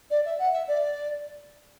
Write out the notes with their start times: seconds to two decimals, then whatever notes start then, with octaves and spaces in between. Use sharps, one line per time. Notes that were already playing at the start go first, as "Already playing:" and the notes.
0.10 D5
0.25 E5
0.39 F#5
0.53 E5
0.68 D5